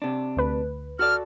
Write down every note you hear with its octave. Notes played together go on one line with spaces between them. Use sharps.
C3 D4
D2 B4
F#4 A4 D5 F6